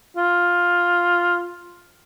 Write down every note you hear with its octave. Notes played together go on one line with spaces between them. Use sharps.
F4